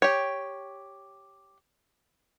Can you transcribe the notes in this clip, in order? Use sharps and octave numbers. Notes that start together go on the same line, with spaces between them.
G4 C#5